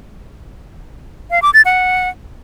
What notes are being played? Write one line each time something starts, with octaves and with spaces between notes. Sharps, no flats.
F5
D6
A6
F#5